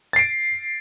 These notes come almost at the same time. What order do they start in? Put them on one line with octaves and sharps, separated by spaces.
A6 C7 D7